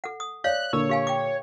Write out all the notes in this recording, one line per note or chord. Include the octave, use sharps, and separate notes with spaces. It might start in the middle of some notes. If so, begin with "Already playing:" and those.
A4 F#5
D#6
C#5 D5 F5 F#6
A#2 D3 A#4 C#5
G4 F5 G#5
G5 D6